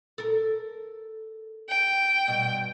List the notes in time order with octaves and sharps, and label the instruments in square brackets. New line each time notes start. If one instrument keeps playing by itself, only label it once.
[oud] A4 A#4
[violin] G5
[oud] G2 B2